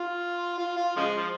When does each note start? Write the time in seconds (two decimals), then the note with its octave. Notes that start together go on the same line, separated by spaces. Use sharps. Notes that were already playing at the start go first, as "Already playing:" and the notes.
Already playing: F4
0.58 F4
0.77 F4
0.97 C#3 F3 G#3
1.16 F3